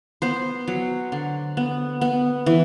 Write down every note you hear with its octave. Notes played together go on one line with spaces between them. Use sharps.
B3 C5
F#3
D3
B3
B3
E3